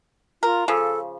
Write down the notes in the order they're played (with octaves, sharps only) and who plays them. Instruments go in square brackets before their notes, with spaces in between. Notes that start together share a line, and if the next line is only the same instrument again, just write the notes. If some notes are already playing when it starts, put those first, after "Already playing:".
[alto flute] F4 [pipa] A#4
[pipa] C#3 F3 [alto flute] A4